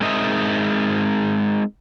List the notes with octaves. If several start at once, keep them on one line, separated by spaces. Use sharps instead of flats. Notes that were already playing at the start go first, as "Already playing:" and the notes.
G#3 C4 D#4 A#4 D#5 E5